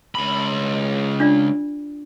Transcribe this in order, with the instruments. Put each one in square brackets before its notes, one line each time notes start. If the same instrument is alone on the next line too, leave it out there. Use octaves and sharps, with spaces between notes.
[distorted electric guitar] C#2 B5
[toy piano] D4 F4 D5